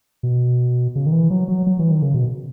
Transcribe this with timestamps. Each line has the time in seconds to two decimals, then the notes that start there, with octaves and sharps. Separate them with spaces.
0.23 B2
0.95 C#3
1.06 D#3
1.12 E3
1.30 F#3
1.48 F#3
1.67 F#3
1.79 E3
1.91 D#3
2.02 C#3
2.14 B2